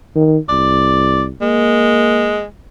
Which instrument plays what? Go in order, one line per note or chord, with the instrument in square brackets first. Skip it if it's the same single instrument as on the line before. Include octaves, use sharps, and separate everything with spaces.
[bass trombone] D#3
[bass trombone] C2 [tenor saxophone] D5
[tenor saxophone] G#3 [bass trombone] A#3